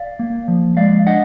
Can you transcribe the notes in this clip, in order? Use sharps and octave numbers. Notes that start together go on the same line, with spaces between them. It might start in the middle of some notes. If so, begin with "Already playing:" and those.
Already playing: D5 F5
A#3
F3
G#3 D5 F5
D4 D#5 F#5